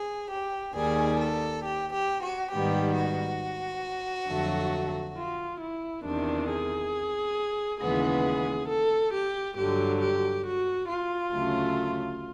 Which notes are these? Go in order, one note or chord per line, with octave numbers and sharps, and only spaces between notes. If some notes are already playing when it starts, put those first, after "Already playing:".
Already playing: G#4
G4
D#2 D#3 G3 G#4
A4
G4
G4
F#4
G#2 D#3 G3 B3 G4
F#4
F2 D3 F#3 A3
F4
E4
E2 C3 D#3 D4
G#4
D#2 C#3 E3 G#3 B3 G#4
A4
G4
G2 D3 F#3 G4
G4
F#4
F4
D2 C#3 F#3 A3